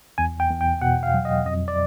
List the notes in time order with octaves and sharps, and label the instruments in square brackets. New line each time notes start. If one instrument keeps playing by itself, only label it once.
[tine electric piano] E2 G#5
G5
E2
G5
B2 F#5
F5
F#3
D#5
F2 D#5
D5